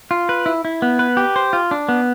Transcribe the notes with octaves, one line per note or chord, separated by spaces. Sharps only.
F4
B4
E4
E4
B3
B4
G4
C5
F4
D4
B3